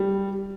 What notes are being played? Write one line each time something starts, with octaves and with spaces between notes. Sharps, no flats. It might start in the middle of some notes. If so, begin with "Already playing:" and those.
Already playing: G3